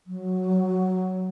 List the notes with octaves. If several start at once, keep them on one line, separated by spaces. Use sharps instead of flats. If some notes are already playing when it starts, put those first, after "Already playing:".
F#3